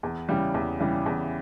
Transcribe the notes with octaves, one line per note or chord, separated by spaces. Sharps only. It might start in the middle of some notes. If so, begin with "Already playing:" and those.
E2
C#3 E3 G3
E2
C#3 E3 G3
E2